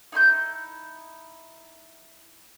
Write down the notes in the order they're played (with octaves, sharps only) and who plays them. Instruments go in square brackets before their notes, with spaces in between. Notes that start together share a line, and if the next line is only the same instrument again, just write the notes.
[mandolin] D#4 E4 C6 G6